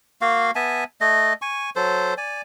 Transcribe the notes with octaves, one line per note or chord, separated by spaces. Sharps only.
A#3 F#4 F5
B3 E5 G#5 A5
A3 D#5
G#5 C#6
F#3 A4 C5
D5 G#5